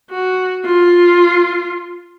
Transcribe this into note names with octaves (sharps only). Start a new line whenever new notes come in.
F#4
F4